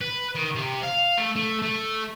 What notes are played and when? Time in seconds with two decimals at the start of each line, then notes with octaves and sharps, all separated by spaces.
0.01 B4
0.35 D#3
0.55 C3
0.83 F5
1.18 A3
1.36 A3
1.62 A3